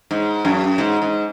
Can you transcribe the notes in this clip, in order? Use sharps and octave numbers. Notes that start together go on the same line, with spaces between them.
G#2
F#2
G#2
G#2